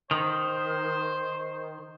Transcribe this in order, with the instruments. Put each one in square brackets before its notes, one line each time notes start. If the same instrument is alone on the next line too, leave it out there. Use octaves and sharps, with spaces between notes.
[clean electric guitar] D#3 [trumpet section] C5